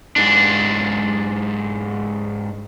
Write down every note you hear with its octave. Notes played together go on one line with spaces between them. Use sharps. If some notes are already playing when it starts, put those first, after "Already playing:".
G#2 D4